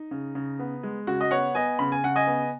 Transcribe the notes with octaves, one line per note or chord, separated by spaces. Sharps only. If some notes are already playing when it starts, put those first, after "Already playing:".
Already playing: D#4
C#3
C#3
B3
G#3
C#3 F#4
D#5
B3 C#5 F#5
B3 D#5 G#5
C#3 B5
G#5
C#3 F#5
D#5 G#5
B3